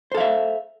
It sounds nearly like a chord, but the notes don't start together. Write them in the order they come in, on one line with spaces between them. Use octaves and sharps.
C5 A4 F5 E5